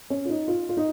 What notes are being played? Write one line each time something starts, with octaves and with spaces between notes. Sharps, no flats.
C#4
F4
D#4
F4
F4
D#4